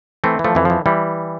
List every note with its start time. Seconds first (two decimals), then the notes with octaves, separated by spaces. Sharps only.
0.24 E3 A3 C4
0.39 E3
0.44 F3 A3
0.55 F2 E3
0.65 E3 F3
0.86 E3 G3